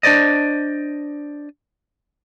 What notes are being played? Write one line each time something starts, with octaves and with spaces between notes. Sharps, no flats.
D4 C5 D5 D#5